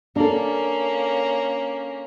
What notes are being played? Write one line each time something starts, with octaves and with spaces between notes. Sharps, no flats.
A#3 C#4 D4 A4